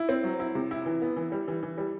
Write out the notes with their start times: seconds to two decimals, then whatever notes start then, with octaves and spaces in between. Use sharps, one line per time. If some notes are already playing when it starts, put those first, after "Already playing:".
Already playing: E4
0.09 C4
0.24 F#3
0.40 E4
0.55 C3
0.71 E4
0.86 E3
1.02 B3
1.17 E3
1.32 G3
1.48 E3
1.63 E3
1.78 G3